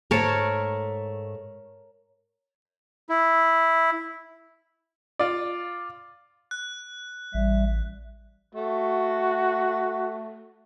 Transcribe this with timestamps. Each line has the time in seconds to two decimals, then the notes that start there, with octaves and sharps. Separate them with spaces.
0.11 G#2 A3 A#4 C#5 A5
3.09 E4
5.19 F4 D5
6.51 F#6
7.34 A1 G3 E5
8.55 A3 F#4